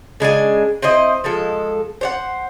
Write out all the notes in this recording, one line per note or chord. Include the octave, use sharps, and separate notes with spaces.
C#3 G#3 D4 G#5
C4 E4 C5 D#5
F3 G#3 A4
C5 C#5 F#5